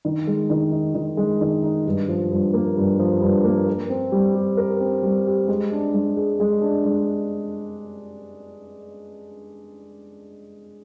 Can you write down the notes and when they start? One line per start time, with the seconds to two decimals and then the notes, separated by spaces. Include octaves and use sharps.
0.05 D#3
0.27 G#3
0.50 D#3
0.72 D#4
0.95 D#3
1.17 G#3
1.41 D#3
1.63 D#4
1.86 G2
2.09 F3
2.31 G2
2.53 A#3
2.77 G2
2.99 F3
3.21 G2
3.44 A#3
3.67 A#4
3.89 C4
4.12 G3
4.35 G4
4.57 A#4
4.80 C4
5.03 G3
5.26 G4
5.48 G#3
5.72 D4
5.94 G#3
6.17 G#4
6.40 G#3
6.61 D4
6.84 G#3